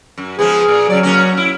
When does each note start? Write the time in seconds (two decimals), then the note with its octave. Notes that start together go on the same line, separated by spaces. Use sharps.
0.18 F#2
0.39 F3 G#3 B3 G#4
0.68 A#2
0.90 C#3 F#3 D5
1.03 A#3 C#4 F#4
1.37 E4